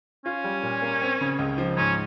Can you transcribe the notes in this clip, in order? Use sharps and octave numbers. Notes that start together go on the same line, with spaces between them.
C#4 F4
G3
A#2
A#3
C4
C#3
C#2
F3
G#2 C#4